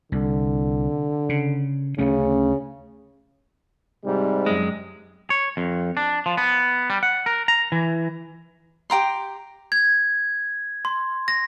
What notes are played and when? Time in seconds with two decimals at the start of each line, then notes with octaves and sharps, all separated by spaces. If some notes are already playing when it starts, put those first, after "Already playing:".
0.12 C2 D3
1.29 C#3
1.98 D2 C#3 A3 C#4
4.05 G#2 C3 G3
4.46 F#2 G#3
5.30 C#5
5.57 F2
5.97 D4
6.26 F3
6.37 B3
6.90 G3
7.03 F#5
7.26 A#4
7.48 A#5
7.72 E3
8.90 G4 G5 A#5 C6
9.72 G#6
10.85 C6
11.28 A#6